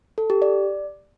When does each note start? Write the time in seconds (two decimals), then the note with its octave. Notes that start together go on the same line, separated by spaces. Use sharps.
0.18 A4
0.30 G4
0.42 D5